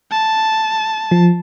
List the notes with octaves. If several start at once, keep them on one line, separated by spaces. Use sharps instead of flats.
A5
F3